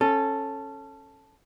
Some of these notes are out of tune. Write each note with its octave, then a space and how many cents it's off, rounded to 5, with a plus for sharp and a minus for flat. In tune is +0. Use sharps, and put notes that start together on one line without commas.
C#4 -20 A4 +0